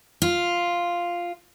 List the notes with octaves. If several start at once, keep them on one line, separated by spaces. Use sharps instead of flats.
F4